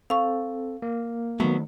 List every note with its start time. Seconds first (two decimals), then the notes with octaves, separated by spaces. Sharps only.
0.10 C4 A4 F5 C#6
0.82 A#3
1.40 D#3 F#3 A3 B3